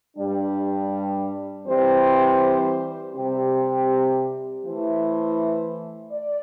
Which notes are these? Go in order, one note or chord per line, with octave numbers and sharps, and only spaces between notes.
G2 G3 D4
E3 G3 C4 G4 C5
C3 G3 C4 G4
E3 A3 E4 C5
D5